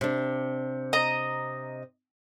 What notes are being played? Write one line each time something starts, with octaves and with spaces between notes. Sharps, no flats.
C3 D4
D#5 A#5